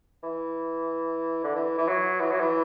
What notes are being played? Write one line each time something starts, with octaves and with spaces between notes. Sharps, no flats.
E3
D3
E3
E3
F#3
E3
F#3
E3